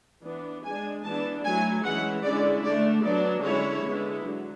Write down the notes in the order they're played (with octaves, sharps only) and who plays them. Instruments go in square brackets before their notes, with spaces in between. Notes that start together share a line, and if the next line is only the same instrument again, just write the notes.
[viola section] E3 B3 D4
G#3 D4 G#5
E3 B3 D4 A5
F#3 A3 E4 G#5
E3 G#3 C#4 E4 F#5
D3 G#3 C#4 E4 D5
D3 A3 D4 D5
F#3 B3 D4 D5
D3 G#3 C#4 E4 C#5
D3 G#3 B3 E4
D3 F#3